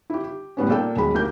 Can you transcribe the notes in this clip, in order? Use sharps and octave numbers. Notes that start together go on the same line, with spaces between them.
E4 G4
G4
A2 G3 B3 C#4
A#2 A#3 A4 D5 G5
D#1 F#3 G#3 B5
D2 G4 A#4 G6